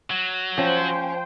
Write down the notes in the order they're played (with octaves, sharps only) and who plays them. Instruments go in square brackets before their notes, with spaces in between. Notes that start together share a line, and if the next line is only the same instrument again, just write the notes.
[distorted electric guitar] F#3
[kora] F3 [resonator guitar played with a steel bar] C#4 [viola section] C5 G5